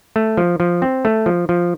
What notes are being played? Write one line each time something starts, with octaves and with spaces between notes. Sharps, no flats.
A3
F3
F3
C4
A3
F3
F3